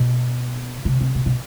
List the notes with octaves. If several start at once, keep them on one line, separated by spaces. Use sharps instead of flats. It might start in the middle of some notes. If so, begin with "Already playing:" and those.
Already playing: B2
C3
C3
B2
B2